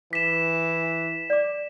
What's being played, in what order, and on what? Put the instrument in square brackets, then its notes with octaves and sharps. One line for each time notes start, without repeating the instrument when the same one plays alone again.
[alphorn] E3 [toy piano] D6 [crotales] B6 E7
[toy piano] D5 D6